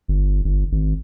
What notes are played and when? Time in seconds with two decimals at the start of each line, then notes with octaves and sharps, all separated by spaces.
0.08 G1
0.45 G1
0.72 G#1